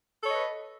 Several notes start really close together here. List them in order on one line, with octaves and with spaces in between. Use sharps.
A4 C#5 D#5 B4